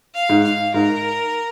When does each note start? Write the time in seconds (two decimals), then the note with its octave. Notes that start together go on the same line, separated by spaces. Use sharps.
0.15 F5
0.29 G#2
0.44 F5
0.74 G#2 A#4